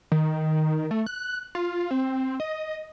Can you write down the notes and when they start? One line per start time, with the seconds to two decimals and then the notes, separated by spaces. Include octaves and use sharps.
0.12 D#3
0.91 A3
1.06 F#6
1.55 F4
1.91 C4
2.40 D#5